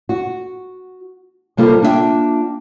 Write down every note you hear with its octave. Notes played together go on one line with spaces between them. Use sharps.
F#4
C3 G3 A#3 F4 G4 A4
A#3 D4 F4 G#4 E5 G5